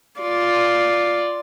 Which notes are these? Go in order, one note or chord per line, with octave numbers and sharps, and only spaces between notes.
F4 D5